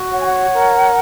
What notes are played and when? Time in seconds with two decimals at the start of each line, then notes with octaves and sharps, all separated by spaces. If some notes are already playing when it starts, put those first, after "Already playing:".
Already playing: F#4
0.11 C#5 F#5
0.19 G#5
0.25 F#5
0.54 A#4